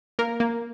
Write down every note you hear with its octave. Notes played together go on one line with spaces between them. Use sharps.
A#3 A#4
A#3